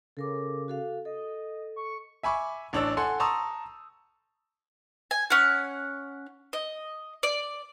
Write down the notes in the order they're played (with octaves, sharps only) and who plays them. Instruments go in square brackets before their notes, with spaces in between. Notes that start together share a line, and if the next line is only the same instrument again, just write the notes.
[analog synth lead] C#3 [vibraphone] A4 A#4 D6
[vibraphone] F#4 A4 F5
[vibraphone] A4 [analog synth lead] D#5
[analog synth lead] C#6
[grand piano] E5 G#5 B5 C#6 D6
A1 D4 C#5 E6
A4 F#5 G#5 C6
A5 A#5 C6 C#6 D#6 E6
[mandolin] G#5
C#4 F#5
D#5
D5